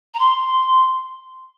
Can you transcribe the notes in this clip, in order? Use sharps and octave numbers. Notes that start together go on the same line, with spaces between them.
A#5
C6